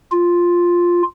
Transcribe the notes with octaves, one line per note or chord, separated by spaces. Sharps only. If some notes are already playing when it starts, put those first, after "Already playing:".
F4